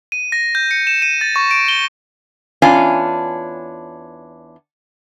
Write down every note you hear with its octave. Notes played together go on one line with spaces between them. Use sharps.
D#7
A#6
G6
C#7
E7
D#7
A6
C#6
D7
G7
E2 C#4 D4 F4 G#5